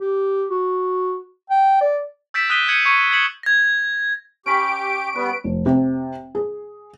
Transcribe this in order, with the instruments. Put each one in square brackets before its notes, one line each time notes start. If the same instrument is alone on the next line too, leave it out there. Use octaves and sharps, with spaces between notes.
[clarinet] G4
F#4
G5
D5
[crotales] E6 G6 A6 B6 D7 E7
D#6 F#6 G6 B6 D#7 G7
G6 G#6 C#7 D#7 F#7
C#6 G#6 C7 C#7 D#7 F7
C7
G#6 B6 C#7 E7 F#7 G7
G#6 A#6
[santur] C#4 B5 C#6 [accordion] G4 [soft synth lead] D7
[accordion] G3 B3 [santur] B4
[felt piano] F1
C3
G#4